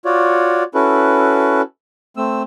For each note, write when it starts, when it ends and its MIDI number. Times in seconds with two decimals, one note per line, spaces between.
0.05 0.63 65
0.05 0.63 66
0.05 0.63 73
0.05 0.63 74
0.75 1.62 61
0.75 1.62 64
0.75 1.62 66
0.75 1.62 69
0.75 1.62 71
2.17 2.42 57
2.17 2.42 60
2.17 2.42 88